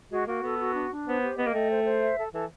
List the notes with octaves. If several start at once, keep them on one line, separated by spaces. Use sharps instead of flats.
G#3 F#4
A#3 F#4
B3 A4
F#4
D4
D4
B3 C5
G4
B3 D#5
A#3
A3 G5
C5
C5
E5
A4
E3 A4